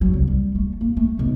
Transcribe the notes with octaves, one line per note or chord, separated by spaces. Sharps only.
F#3
C2
G3
A3
A#3
A3
B1